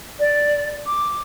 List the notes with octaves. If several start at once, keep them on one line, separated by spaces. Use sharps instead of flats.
D5
D6